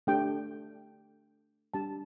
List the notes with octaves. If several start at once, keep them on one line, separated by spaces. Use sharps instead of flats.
A3 D4 G4 G5
G3 D4 G4 A5